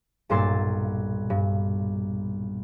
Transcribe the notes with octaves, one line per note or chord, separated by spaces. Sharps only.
B1 G2 A#2 C6 E6 A6
G2